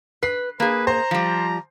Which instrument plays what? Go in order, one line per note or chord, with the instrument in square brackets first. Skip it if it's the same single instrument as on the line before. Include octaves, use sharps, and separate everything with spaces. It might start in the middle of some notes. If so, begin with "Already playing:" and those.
[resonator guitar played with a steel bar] B4 [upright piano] C7
[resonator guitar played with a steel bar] A#3 G#4 [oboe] B4
[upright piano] C5 [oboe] A#5
[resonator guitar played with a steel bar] F3 G3